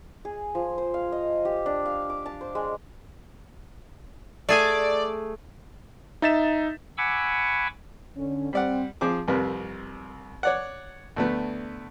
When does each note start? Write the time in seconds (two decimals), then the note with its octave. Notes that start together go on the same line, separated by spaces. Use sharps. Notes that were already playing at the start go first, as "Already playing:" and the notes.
0.25 G#4
0.55 F3
0.78 C5
0.94 F5
1.12 D#5
1.45 G4
1.66 D4
1.85 F5
2.10 D6
2.26 A5
2.41 C5
2.55 G#3
4.49 A3 G#4 D5 G#5
6.22 D#4 E5 A6 B6 E7
6.98 F#5 G#5 B5 C#6 D6 E6
8.17 D3 C#4
8.53 G3 C4 D5 F#5
9.01 F3 C4 G#4 D6
9.28 C2 F2 C3 A#4 B4
10.43 C#5 D5 F#5
11.16 D2 A3 B3